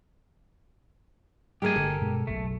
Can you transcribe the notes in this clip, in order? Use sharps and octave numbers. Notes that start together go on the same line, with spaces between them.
G#3 A3 G4 A#4 G#5
G1 D3 A4
G2 B2 G#3
F#1 B1 F#2 A3